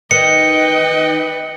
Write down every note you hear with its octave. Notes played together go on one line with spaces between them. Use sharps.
D#3 B4 D#5 G5 C#7